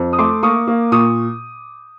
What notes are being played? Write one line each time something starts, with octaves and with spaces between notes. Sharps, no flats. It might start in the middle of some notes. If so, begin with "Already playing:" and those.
Already playing: F2
D#6
A3 C6 D6
A#3 C#6 D#6
A#3
A#2 C#6 D#6